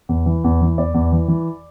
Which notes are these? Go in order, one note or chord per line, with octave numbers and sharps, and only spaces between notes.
E2
E3
E2
E3
E2 D5
E2
E3
E3